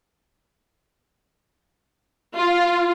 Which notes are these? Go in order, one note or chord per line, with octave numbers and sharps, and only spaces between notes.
F4